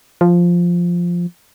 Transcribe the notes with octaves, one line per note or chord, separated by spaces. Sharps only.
F3